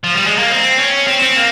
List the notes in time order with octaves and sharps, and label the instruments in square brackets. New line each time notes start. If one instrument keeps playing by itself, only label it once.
[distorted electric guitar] F3
G3
G#3
A#3
C4
C#4
C4
C4
A#3